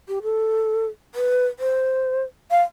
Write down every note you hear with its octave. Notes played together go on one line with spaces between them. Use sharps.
G4
A4
B4
C5
F5